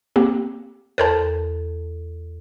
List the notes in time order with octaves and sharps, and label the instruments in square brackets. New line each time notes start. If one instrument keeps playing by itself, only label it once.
[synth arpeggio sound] A#3 C4 G4
[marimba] E2 A4 [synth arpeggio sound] A#4 C5 A5